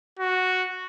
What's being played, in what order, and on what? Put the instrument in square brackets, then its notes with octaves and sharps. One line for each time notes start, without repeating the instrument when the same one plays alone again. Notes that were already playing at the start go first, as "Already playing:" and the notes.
[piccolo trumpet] F#4